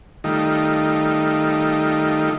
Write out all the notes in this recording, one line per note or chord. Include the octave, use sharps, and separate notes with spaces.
D#3 G3 A3 D#4 F4